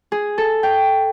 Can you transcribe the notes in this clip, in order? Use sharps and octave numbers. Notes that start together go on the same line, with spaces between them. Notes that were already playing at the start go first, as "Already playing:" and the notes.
G#4
A4
G5